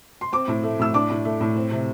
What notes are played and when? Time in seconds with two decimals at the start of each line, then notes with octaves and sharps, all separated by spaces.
0.21 C6
0.32 C4 D6
0.48 A2
0.63 A3
0.79 A2 E6
0.94 D4 D6
1.10 A2
1.25 A3
1.41 A2
1.56 C4
1.71 C3